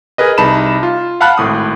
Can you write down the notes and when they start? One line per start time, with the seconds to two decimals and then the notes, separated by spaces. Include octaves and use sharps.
0.18 G#4 A#4 B4 D#5
0.38 C2 D#4 A5 B5 E7
0.83 F4
1.21 F5 F#5 A5 B5 F6 F#6
1.38 G#1 A2 D#6